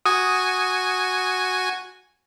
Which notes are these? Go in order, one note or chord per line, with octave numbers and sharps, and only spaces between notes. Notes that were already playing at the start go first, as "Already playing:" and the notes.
F#4 G#5 D#6